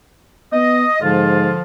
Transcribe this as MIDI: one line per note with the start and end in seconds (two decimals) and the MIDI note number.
0.53 0.86 59
0.53 1.01 75
1.02 1.51 44
1.02 1.62 50
1.02 1.62 53
1.02 1.62 65